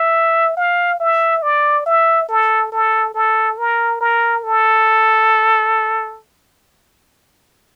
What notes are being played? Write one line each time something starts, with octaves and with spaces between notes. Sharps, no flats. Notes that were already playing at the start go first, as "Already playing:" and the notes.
Already playing: E5
F5
E5
D5
E5
A4
A4
A4
A#4
A#4
A4